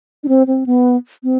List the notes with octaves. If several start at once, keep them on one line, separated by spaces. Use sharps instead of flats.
D4
C4
C4
B3
C4